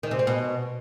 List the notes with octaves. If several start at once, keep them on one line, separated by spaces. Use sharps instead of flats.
D#3
C3
C4
B2